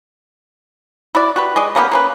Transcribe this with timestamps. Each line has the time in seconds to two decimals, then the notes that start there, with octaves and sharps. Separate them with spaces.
1.15 E4 F#4 D5
1.36 F#4 G4 B4
1.56 G#3 D5 D#5
1.75 C#3 A#3 B3 G4
1.91 A#3 C#4 B4